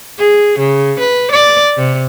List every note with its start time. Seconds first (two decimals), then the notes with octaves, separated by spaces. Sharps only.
0.18 G#4
0.59 C#3
0.99 B4
1.31 D5
1.77 C3